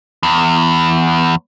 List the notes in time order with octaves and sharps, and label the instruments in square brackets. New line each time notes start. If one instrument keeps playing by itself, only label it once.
[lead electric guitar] E2